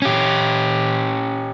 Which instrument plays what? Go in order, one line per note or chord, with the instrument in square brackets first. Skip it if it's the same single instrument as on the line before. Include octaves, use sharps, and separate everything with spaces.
[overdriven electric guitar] C#4 G4